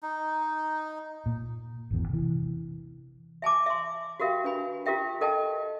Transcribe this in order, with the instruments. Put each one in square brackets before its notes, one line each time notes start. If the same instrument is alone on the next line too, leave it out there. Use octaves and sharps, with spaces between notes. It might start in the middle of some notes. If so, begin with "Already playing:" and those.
[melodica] D#4
[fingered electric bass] A#2
G#1 E2
C3 E3
[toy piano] E5 G#5 A5 D6
E5 C6
F#4 G4 A#4 E5 F5 G5
D4 B4 G#5 B5
F4 G4 A#4 E5 G5
A4 A#4 D#5 G5 A5